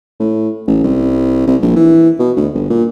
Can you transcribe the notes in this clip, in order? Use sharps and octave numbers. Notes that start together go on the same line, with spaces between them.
A2
A1
C2
C2
A#1
E3
B2
D2
G1
A#2